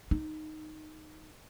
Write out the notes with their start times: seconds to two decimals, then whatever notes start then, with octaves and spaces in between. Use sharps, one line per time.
0.11 D#4